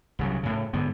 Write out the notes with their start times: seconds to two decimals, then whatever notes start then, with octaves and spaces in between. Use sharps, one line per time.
0.19 C2 C#3 F#3
0.43 A2 C#3
0.73 G#2 D3 B3